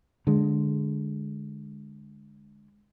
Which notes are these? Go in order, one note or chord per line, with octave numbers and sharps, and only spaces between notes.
D3 G#3